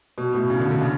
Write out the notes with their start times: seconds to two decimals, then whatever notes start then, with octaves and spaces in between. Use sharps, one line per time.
0.18 B2
0.33 A2
0.50 C#3
0.60 D3
0.71 D3
0.81 C#3